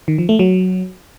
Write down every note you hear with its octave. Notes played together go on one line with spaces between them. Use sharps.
D#3
F3
A3
F#3